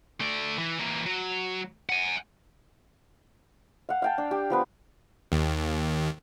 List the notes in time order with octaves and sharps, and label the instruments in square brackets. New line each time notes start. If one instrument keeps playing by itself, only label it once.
[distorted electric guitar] A3 D5
E3
E3 A#3
F#3
F#5 G#5
[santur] F5 F#5
F5 G5 A5
D4
G4
F3 B3 B4
[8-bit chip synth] D#2